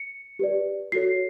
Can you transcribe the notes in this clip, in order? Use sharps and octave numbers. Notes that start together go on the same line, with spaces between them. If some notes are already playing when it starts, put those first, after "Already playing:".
Already playing: C#7
G4 B4 D5
F#4 A4 C#5 C7